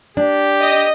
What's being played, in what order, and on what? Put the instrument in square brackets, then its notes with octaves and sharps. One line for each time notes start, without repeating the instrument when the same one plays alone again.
[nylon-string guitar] D4 [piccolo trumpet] G4
[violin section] D#5